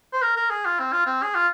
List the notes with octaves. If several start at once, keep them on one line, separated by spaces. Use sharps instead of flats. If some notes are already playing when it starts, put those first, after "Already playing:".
C5
A#4
A#4
G#4
F4
C4
F4
C4
G#4
F4